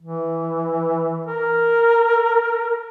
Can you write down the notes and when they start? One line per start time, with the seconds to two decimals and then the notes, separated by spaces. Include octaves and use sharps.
0.01 E3
1.27 A#4